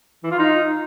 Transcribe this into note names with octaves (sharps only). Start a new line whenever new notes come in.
E3
F4
D#4